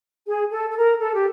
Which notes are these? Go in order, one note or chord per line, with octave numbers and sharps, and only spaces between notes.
G#4
A4
A4
A#4
A4
G4